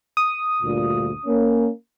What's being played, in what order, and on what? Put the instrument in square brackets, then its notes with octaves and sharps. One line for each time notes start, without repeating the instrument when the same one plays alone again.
[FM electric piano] D#6
[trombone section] D2 G2 A#2
A#3 C#4